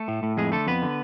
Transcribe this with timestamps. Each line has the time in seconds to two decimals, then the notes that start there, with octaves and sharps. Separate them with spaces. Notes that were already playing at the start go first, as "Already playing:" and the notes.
Already playing: A3 A4
0.08 A2
0.23 A2
0.37 F2 G#3 G#4
0.52 D3 A3 A4
0.67 F2 B3 B4
0.82 D3